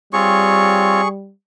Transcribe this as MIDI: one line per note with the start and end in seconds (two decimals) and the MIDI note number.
0.13 1.32 55
0.13 1.01 60
0.13 1.01 65
0.13 1.08 68
0.13 1.01 73
0.13 1.08 85